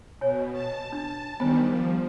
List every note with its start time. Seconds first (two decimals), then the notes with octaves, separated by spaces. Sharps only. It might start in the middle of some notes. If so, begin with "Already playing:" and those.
0.21 B2 C#5 G#5
0.52 A5
0.92 D4 A5
1.40 D#3 G3 B3 C5 G#5
1.68 F3